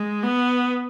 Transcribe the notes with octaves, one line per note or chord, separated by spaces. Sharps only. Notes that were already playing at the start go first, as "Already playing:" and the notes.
Already playing: G#3
B3